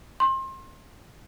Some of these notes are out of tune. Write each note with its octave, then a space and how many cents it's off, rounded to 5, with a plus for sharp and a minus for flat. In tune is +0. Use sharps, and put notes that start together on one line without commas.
C6 +30